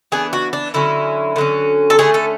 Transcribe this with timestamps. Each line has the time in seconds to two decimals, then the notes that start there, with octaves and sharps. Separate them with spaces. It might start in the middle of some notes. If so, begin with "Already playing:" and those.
0.12 E3 B3 D4 G#4
0.33 F#4
0.53 D4
0.74 D3 F#3 C#4 E4
1.36 D3 F#3 C#4
1.90 A4
1.98 D3 A3 C#4 G#4
2.14 A4